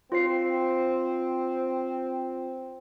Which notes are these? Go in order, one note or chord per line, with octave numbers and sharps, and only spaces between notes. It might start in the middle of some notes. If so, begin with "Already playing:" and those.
C4 F4 C5 C7